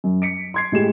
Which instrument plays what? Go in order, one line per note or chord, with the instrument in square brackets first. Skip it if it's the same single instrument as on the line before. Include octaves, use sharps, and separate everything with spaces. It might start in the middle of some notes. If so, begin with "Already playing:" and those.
[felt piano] F#2
B6 C#7 D7
C6 G#6 C7
A2 G#3 G4 E7